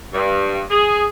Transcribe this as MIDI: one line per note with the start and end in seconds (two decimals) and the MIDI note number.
0.14 0.64 43
0.71 1.06 68